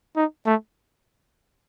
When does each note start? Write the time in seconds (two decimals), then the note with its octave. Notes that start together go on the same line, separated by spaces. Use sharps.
0.16 D#4
0.46 A3